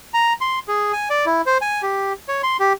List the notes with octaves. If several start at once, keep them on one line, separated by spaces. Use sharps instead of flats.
A#5
C6
G#4
G#5
D5
E4
C5
G#5
G4
C#5
C6
G4